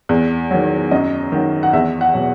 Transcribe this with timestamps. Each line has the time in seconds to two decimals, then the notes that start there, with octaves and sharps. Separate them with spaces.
0.09 E2
0.51 D#3 F#3
0.91 F#2 D#5
1.32 D#3 F#3
1.63 F#5
1.73 E2 E5
2.01 F#5
2.14 B2 F#3